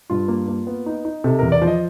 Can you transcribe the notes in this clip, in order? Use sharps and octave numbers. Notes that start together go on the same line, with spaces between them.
G2 F4
A#3
A#3
B3
D#4
D#4
C3 A4
E2 A#4
D5
F3
D#5